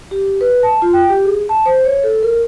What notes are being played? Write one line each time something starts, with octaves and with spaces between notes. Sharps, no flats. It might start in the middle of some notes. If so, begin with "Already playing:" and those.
G4
B4
A5
F4
G5
G4
G#4
A5
C5
C#5
A4
A#4